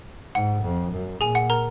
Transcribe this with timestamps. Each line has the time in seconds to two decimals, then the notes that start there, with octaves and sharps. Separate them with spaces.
0.35 G#2 F#5
0.63 F2
0.92 F#2
1.21 A#2 G#4 G#5
1.35 F#5
1.50 A#4 A#5